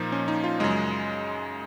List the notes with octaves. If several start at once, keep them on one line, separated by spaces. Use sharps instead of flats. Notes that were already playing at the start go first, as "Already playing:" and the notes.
Already playing: A#2 F3 A#3 D#4
C#4
D#4
F4
F#2 C#3 G#3 G#4